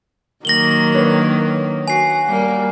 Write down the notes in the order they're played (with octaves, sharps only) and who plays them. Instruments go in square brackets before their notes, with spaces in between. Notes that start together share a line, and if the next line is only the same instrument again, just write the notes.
[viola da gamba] D#3 F#3 A#3 [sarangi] A#4 [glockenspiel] A#6 F#7 G7
[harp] D4 B4 C#5
[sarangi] F#4 [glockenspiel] G#5 C7
[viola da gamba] G3 [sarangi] A#3